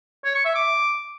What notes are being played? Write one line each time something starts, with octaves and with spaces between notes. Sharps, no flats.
C#5
C#6
E5
D6